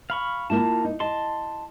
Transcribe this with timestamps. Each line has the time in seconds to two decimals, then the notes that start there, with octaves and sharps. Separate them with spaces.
0.10 F5 B5 C#6
0.50 A#3 E4 F4 A5
0.85 D#4
1.00 D#5 A5 C6